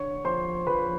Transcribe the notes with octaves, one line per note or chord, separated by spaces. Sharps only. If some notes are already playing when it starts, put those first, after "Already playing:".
Already playing: D3 C#5 C#6
F3 C5 C6
F3 B4 B5